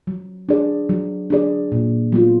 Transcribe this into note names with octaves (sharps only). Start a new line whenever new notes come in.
F#3
D4 G#4 D5
F#3
D4 G#4 D5
A#2
F#3 B3 F4